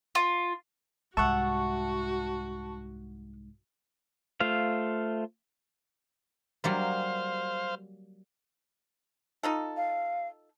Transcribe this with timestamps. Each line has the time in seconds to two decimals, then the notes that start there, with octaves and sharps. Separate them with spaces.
0.15 F4
1.17 C2 G#2 F#4 E5 F#5 A5 C#6
4.40 A3 F4 C5 F5
6.64 F#3 G3 A#3 C5 F5
9.43 D#4 F4 A4
9.77 F5